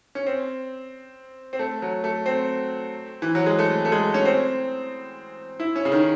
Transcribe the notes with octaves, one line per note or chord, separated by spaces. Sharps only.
C#4
C4
C4
A3
F#3
A3
C4
E3
F#3
G#3
A3
A3
G#3
C#4
C4
E4
C#4
C#3
D#3